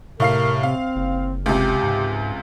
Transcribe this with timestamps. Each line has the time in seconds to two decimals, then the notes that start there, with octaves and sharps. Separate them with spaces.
0.20 A2 C3 A#4 F5 C7
0.63 C4 F5
0.96 F#1
1.46 C#2 C3 G4
1.83 G#2